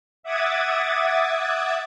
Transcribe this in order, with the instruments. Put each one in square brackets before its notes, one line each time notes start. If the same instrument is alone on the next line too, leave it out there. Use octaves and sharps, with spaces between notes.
[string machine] E5 F#5 D6 D#6 G#6 A6